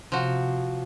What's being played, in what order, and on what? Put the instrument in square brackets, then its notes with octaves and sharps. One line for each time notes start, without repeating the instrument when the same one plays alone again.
[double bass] C3 [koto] F3 F#4